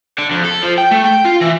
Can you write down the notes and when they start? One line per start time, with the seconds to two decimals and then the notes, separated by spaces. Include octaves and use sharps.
0.18 D3
0.31 F2
0.44 A4
0.63 F3
0.78 G5
0.92 A3
1.05 G5
1.25 F4
1.42 E3